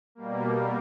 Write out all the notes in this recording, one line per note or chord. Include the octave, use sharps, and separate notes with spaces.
B2 G3 A#3